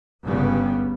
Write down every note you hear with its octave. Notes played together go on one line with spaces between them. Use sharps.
G1 C#2 G2 C#3 G3 B3